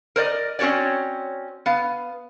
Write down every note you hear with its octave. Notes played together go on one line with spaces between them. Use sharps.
A#4 C5 D5 D#5
C4 C#4 F#4 C#5 D5
B3 F5